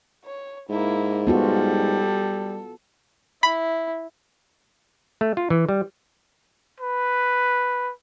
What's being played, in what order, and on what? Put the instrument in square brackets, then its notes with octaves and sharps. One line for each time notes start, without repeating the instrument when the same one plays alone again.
[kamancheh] C#5
[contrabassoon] G#2 [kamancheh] A#3 E4
[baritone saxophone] G3 [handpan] B3 F4 F#4 [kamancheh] A4
[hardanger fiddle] E4 [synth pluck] B5
[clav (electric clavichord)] A3
F4
E3
G3
[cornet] B4